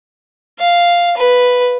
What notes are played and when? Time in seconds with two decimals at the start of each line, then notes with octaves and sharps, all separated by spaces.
0.59 F5
1.17 B4